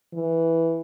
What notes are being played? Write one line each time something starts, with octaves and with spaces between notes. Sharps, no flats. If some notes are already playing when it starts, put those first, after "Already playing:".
E3